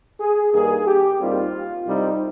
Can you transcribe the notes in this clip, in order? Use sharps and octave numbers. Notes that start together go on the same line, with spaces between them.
G#4
G2 D#3 A#3 G#4
G4
D#2 D#3 G3 C4 F4
C2 C3 G3 C4 D#4